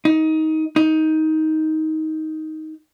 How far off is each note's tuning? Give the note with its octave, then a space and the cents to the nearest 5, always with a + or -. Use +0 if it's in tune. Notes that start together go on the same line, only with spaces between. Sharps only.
D#4 +20
D#4 +15